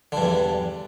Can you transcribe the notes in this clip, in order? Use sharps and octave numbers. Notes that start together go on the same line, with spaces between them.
E2 G2 D3